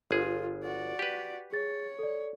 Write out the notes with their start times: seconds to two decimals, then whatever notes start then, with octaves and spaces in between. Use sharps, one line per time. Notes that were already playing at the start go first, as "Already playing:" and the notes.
0.11 G1 F4 G#4
0.63 F#4 D5
0.99 G4 B4
1.53 G#4 C#5 A6
1.99 A4 D5